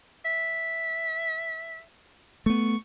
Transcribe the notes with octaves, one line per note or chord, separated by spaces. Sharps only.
E5
A3 B3 C#6